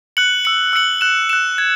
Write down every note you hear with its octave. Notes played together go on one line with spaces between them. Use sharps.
F#6 C#7 F#7
E6 C#7 F#7
E6 C#7 F#7
F#6 E7
F#6 E7
G#6